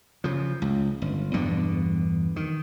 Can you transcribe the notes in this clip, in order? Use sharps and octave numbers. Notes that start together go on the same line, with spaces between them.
C#3 F3
C#2
G1
E2 G2 B2 D3
D#3